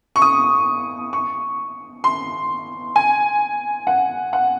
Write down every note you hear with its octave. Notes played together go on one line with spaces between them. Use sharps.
C#6
D#6
C#6
C6
G#5
F#5
F#5